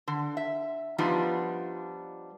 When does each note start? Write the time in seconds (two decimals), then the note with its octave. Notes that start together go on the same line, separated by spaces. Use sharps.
0.08 D3
0.37 E5
0.98 F3 G3 B3 D4 D#4 F4